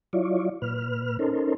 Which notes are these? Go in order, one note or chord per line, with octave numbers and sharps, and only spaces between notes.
F#3 E4 F4 C#5 D5
A#2 B4 F6
C#4 D#4 A4 A#4 C5